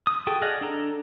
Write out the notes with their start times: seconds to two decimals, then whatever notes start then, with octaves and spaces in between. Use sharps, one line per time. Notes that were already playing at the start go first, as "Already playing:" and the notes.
0.07 D#6
0.27 F#4 G#4 A4 G5
0.42 G#4 D5 D#5 F5 F#5
0.61 D4 A4 A#5